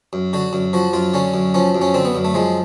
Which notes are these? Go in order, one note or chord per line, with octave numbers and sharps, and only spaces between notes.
F#2
D3 F#4
F#2
F3 F#4
F#2 F4
D3 C#4
F#2
F3 C#4
F#2
C#4
D3 C4
B3
F#2
A3
F3 G#3